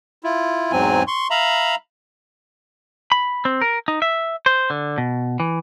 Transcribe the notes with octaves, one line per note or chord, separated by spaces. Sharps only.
E4 F4
E2 G#2 F#3 C4 G#5
C6 C#6
E5 F5 A#5 B5
B5
C4
A#4
D#4
E5
C5
D3
B2
E3